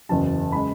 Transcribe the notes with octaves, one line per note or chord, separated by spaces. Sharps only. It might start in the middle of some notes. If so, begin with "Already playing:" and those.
F#1 E2 C#3 F#3 A5
C#3 G#3 B5